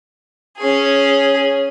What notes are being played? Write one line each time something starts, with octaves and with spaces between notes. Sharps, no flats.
C#4 G#4